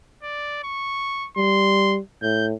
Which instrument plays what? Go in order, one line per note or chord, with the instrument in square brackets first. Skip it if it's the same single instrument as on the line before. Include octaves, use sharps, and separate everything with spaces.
[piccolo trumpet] D5
C#6
[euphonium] G3 [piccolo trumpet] C6
[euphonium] A2 [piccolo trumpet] G6